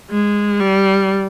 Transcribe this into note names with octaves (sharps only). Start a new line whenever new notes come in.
G#3
G3